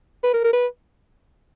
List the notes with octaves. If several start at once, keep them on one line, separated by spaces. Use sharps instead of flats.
B4
A#4
A#4
B4